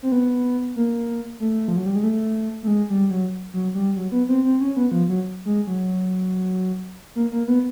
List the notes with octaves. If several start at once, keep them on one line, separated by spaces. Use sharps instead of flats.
C4
B3
A#3
A3
F3
F#3
G3
G#3
A3
A3
G#3
G3
F#3
F#3
G3
F#3
B3
C4
C4
C#4
B3
F3
F#3
G#3
F#3
A#3
A#3
B3